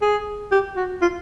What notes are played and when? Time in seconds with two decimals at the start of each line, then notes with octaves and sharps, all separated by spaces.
0.02 G#4
0.52 G4
0.76 F#4
1.02 F4